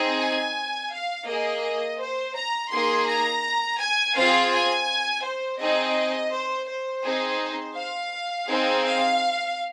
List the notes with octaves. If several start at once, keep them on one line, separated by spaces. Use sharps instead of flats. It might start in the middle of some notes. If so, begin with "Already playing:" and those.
Already playing: C4 D#4 G#4
G#5
F5
A#3 G#4 D#5
C5
A#5
A#3 D#4 G#4 C6
A#5
G#5
C4 F4 G#4 F5
G#5
C5
C4 D#4 G#4 D#5
C5
C5
C4 D#4 G#4
F5
C4 D#4 G#4
F5